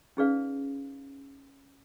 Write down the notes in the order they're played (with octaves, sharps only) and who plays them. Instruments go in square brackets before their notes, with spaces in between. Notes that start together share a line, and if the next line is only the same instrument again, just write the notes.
[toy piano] C#4 D#4 G#4 B4 D5 F5